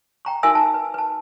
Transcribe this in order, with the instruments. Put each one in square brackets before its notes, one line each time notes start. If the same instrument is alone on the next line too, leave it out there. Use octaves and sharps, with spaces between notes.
[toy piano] G5 A#5 C#6
D#4 F#4 A#4 E5 G#5 E6
A5
B4
B4 A5